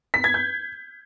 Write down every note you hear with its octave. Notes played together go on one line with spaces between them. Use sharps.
B6
G#6
G6